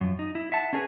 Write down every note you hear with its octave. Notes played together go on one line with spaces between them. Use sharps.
F#2 F3
D#4
E4
E5 F#5 A5
C#4 D4 G#4 A#4 B4 G#5